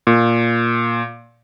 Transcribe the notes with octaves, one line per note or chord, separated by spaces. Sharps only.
A#2